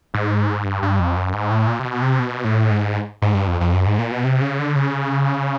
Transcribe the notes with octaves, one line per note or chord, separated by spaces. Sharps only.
G#2
G2
G2
F2
F#2
G#2
A2
A#2
C3
B2
C3
B2
A2
G#2
G#2
G2
F2
F2
F#2
G#2
A#2
B2
C3
C#3
D3
C#3